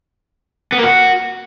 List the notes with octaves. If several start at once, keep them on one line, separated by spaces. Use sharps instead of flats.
B3
A#3
F#4